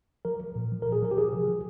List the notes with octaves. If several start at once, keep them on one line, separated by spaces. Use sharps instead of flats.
F3 A#4
F3
A#2
F3
A#2 A#4
G#4
F3 A#4
G4
F3 G#4
C3
F3